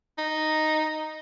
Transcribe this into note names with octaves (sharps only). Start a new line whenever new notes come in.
D#4